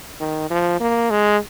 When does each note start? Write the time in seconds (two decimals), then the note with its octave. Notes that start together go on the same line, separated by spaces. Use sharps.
0.20 D#3
0.50 F3
0.80 A#3
1.11 G#3